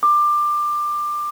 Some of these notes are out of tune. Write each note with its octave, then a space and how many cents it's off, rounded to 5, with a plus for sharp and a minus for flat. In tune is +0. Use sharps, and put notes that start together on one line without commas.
D6 +20